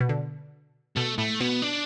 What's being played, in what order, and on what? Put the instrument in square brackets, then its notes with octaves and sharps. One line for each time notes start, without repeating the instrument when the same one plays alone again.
[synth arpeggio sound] B2
D3
[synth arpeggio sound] B2 [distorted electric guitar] A3
[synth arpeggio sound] A2 [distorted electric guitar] A3
[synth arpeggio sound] B2 [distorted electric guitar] B3
[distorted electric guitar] D4